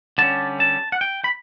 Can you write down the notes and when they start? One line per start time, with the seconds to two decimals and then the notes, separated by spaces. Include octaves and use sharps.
0.18 D3 G3 C#4 A5
0.60 A5
0.92 F#5
1.01 G5
1.24 B5